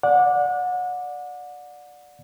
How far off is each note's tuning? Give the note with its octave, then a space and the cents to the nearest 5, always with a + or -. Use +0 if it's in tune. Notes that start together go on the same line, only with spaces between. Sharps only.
D5 +0 F#5 -30